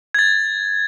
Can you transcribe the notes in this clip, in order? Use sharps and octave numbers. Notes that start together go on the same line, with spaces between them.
G#6 A6